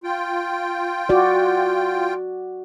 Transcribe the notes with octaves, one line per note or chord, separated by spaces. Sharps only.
F4 G5
F#4 D5